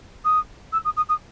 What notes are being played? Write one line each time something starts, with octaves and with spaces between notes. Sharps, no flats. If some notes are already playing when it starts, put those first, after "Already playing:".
D#6
E6
D#6
D#6
D#6